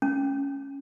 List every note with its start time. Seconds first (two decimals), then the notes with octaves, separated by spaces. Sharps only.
0.02 C#4